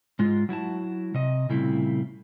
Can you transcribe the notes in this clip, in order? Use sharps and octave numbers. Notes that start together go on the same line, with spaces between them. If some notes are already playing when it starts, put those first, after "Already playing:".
G#2 G#3 F4
F#3 E4 F#4 A5
C3 D#5
A#2 C#3 G3 A3 C4 E4